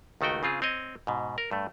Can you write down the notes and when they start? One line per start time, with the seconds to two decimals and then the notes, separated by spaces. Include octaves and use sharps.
0.21 C#2 D#3 A3 F#4 G5
0.43 C#3 C4 F4 G#4
0.62 C4 C#5 D#5
1.07 G#2 B2
1.38 A#4
1.51 G2 A3